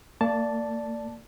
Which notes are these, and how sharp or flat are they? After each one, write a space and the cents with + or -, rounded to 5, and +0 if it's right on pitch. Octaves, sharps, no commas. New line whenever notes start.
A#3 -40 D5 +0 A5 +0